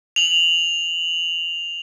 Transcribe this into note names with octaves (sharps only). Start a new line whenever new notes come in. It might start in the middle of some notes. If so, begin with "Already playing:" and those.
F7 F#7